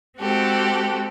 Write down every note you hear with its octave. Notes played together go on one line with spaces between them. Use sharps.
G#3 C4 F#4 G4 A4